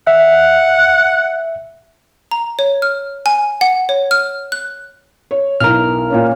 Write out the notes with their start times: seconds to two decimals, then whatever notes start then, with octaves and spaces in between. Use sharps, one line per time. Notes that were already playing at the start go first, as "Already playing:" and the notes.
0.07 E5 F#5
2.31 A#5
2.59 C#5
2.82 F6
3.26 G#5
3.61 F#5
3.89 C#5
4.11 F6
4.52 F#6
5.31 C#5
5.60 B1 E4 A#4 F6
6.10 A#2 A#3 C#4